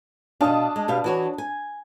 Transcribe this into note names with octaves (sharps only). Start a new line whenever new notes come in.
B2 D4 D#5 F5 A5 D#6
G#3
B2 G4 F5
E3 F#4 C#5
G#5